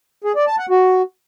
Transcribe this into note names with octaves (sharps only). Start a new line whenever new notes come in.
G#4
D5
A5
F#5
F#4